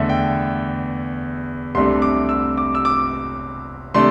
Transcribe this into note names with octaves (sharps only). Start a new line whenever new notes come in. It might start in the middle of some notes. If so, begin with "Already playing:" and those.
Already playing: E2 D3 A3 E5
G5
C2 C3 A3 D4 C6
D6
E6
D6
E6
D6
C3 A3 D4 C6